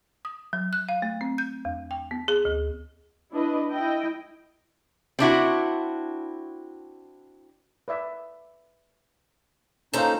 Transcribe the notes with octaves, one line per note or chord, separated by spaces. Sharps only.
D#6
F#3
F#6
F5
A3
C4
G6
E2
G5
B3
G#4
D2
D4 E4 B4 D#5
E4 D#5 G5
C4 D4 E4 F#4
B4 D5 E5
A#3 C#4 D#4 F4 A4 C5 F5 A#5